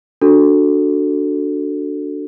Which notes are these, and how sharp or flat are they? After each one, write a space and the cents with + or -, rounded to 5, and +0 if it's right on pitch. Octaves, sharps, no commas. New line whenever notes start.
D4 +0 F#4 +0 A4 +5